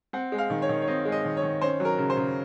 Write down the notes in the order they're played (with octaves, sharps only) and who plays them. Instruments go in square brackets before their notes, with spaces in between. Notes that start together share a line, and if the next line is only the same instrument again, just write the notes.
[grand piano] C4 F#5
G#3
F5
D#3
C#5
D#3
C#5
C4 D#5
G#3
D#5
D#3
C#5
D#3
C#4 C5
F#3
A#4
C#3
C5
C#3